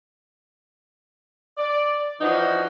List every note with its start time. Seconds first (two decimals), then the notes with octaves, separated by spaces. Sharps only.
1.58 D5
2.21 E3 F3 D4 D#4 F#4